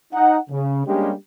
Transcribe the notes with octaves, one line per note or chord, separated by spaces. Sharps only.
D#4 F#5
C#3
G3 G#3 A#3 C#4 D4 G4